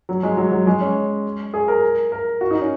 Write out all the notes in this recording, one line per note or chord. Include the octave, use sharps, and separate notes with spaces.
F#3
G#3
F#3
F#3
G#3
C#4
G#4
A#4
A#4
F#4
D#4
C#4